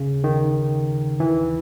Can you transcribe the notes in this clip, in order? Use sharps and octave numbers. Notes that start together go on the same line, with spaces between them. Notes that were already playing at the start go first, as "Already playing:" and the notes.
Already playing: C#3
D#3
E3